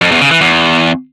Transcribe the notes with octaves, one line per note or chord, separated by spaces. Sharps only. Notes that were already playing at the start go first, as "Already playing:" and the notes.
F2
E2
C#3
E3
E2